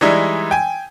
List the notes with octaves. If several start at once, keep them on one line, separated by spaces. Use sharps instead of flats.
E3 G3 G#3 D#4 E4
G5 G#5